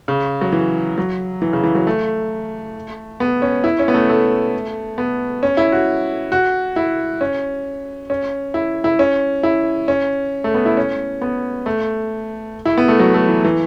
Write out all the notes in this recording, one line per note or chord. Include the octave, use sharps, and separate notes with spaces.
C#3
F#3
E3
F#3
E3
C#3
E3
F#3
A3
B3
C#4
E4
C#4
B3
A3
A3
B3
C#4
E4
F#4
F#4
E4
C#4
C#4
E4
E4
C#4
E4
C#4
A3
B3
E4
C#4
B3
A3
E4
B3
A3
F#3
A3
E3
E3